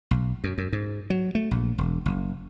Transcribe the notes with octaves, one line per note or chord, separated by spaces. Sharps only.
B1
F#2
F#2
G#2
F#3
A3
A#1
E1
F#1